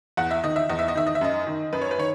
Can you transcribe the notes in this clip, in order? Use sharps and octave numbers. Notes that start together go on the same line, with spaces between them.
E2 F#5
E5
D#3 D#5
E5
E2 D#5
E5
D#5
D#3 E5
D#5
E5
F#2 D#5
D#3
F#2 B4
C#5
B4
D#3 C#5